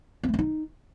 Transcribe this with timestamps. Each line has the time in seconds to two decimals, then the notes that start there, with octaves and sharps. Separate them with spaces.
0.23 C4
0.29 A3
0.34 C#4
0.39 D#4